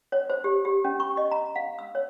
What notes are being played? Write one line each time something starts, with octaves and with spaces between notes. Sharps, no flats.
C#5
C5
G4
G4
C#4
C#6
D#5
A#5
F5
E6
C#5